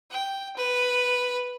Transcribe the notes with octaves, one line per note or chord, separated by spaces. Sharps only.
G5
B4